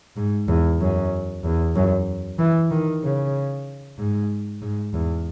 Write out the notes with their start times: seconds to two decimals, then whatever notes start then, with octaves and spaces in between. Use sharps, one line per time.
0.16 G#2
0.48 E2
0.80 F#2
1.44 E2
1.76 F#2
2.39 E3
2.71 D#3
3.03 C#3
3.98 G#2
4.62 G#2
4.94 E2